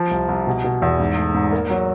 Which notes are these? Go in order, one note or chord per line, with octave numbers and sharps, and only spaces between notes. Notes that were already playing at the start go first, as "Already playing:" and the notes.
Already playing: F3
C2
C2
B2
B2
E2
G#2
A3
G#2
A#3
F#3